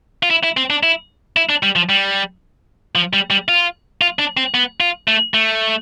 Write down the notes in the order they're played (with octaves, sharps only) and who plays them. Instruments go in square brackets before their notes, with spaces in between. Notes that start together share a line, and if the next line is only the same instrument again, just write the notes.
[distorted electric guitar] F4
E4
E4
C4
D4
E4
E4
D4
G3
F3
G3
F3
G3
G3
F4
F4
D4
C4
B3
F4
A3
A3